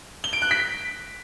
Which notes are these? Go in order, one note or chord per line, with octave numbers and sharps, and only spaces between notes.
G7
D7
F#6
B6